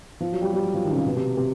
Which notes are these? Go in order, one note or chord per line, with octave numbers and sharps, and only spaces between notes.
F3
F#3
G3
G3
F#3
F3
D#3
C#3
C3
B2
C3
C3